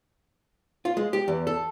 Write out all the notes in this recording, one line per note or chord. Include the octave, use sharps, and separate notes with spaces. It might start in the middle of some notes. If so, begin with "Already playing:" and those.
F4
G#3
G4
E2
A4